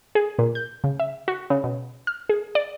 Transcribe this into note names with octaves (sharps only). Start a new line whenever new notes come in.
G#4
A#2
G6
C#3
E5
F#4
C#3
B2
F6
G#4
D5